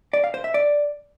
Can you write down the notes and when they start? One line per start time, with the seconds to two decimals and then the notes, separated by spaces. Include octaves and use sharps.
0.13 D5
0.24 F5
0.34 C5
0.44 E5
0.54 D5